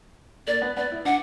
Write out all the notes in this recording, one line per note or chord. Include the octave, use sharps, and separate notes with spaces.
A#3 D5
B3
B3 D5
E4
D4 F#5